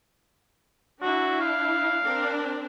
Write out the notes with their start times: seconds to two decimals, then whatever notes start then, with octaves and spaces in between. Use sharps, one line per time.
1.02 D4 E4 F#4
1.40 F5
2.03 C4 D4 A#4